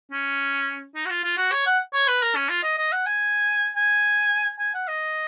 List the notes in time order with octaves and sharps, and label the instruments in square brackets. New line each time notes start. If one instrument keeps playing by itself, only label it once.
[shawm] C#4
D#4
F#4
F4
F4
F#4
C#5
F#5
C#5
B4
A#4
C#4
F4
D#5
D#5
F#5
G#5
G#5
G#5
F#5
D#5